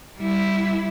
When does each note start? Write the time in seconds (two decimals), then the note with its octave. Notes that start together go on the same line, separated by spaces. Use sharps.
0.18 G3 E4